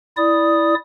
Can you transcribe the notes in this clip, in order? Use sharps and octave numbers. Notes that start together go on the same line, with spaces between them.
E4 D5 D#6